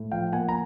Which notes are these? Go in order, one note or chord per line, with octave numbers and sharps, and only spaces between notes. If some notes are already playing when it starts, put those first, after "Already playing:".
Already playing: A2
F3 F5 G5
A#3 F#5 G#5
A#5